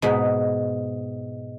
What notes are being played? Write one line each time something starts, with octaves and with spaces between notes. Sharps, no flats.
G#2 B2 B5